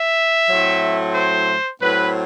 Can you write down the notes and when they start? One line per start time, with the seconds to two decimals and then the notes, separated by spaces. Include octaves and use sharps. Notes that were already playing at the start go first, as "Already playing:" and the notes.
Already playing: E5
0.49 A2 F#3 A3 C4
1.15 C5
1.80 A2 F#3 C4 B4